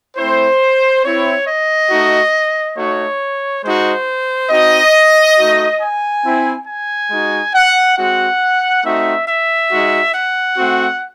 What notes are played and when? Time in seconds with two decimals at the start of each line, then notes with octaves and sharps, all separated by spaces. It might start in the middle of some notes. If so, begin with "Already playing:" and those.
0.17 A3 C4 E4 C5
1.04 C4 E4 C#5
1.47 D#5
1.90 A3 D#4 F#4
2.77 A3 D#4 F#4 C#5
3.64 G#3 D#4 F#4 C5
4.50 C4 D#4 F#4 D#5
5.38 A3 D#4 F#4
5.81 G#5
6.24 C4 E4
6.67 G#5
7.11 G#3 D#4 F#4
7.53 F#5
7.97 G#3 C4 F#4 F#5
8.83 A3 C4 D#4 F#4 E5
9.27 E5
9.71 G#3 D#4 F#4
10.14 F#5
10.57 A3 C4 F#4